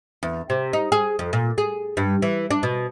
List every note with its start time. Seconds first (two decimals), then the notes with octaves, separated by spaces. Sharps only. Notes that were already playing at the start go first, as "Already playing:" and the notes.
0.23 E2
0.50 C3
0.73 D#4
0.92 G#4
1.19 F2
1.33 A#2
1.58 G#4
1.97 G2
2.22 E3
2.51 D4
2.63 B2